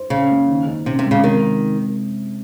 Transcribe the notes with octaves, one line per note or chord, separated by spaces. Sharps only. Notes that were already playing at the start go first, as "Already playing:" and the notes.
Already playing: C5
C#3 C#4
A#3
D#3
D#4
C3 C#4
C3
G#3
C#3
C3 D#3